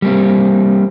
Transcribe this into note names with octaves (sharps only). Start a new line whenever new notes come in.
G3 A#3 C4